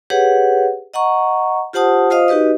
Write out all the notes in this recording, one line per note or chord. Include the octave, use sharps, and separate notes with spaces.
G4 G#4 B4 C#5 F#5
D#5 F#5 A#5 C#6
F4 G4 C5 F#5 A5 D#6
F4 C5 D#5 F5 D#6
D#4 F#4 G4 B4 D#5